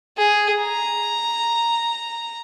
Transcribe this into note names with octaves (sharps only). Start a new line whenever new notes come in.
G#4
A#5